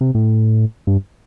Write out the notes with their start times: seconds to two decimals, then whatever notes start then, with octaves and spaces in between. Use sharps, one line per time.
0.01 C3
0.15 A2
0.87 G2